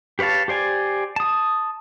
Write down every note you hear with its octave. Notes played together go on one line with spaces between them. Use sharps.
G4 B4 C#5 F5 A5
G4 C5 D5 G#5
A5 D#6